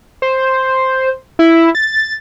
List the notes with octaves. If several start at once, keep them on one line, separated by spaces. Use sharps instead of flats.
C5
E4
A6